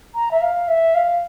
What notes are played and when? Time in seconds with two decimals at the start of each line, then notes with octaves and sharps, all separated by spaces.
0.15 A#5
0.31 E5
0.41 F5
0.68 E5
0.95 F5